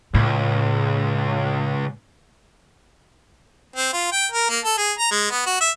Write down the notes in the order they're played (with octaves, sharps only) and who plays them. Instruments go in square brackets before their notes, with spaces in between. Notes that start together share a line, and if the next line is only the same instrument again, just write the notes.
[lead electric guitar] C#2 [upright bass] A2
[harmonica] C4
F4
G5
A#4
A#3
A4
G#4
A#5
G#3
B3
F#4
E5